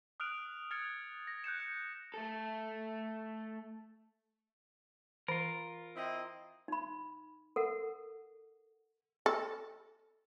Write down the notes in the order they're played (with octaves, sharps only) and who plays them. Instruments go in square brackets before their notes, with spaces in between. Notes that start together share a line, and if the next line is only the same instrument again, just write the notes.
[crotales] D#6 F6 F#6 D7 F7
F6 G#6 A6 C#7 F7
A#6
F#6 G6 C#7 E7
C#7
[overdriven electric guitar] A3 A4
[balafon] E3 [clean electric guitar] F4 A#4
[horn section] C4 E4 D#5
[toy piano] D#4 B5
A4 A#4 F#5
[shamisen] A4